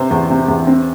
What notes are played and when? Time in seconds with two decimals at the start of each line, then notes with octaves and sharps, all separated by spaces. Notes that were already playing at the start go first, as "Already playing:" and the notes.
Already playing: C3 C5
0.11 E2
0.30 C3
0.48 E2
0.67 C4